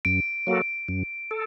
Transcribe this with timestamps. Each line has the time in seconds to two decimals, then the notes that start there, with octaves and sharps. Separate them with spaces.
0.05 F#2 D7
0.47 F#3 A#3 F#4 A4
0.88 F#2
1.31 A4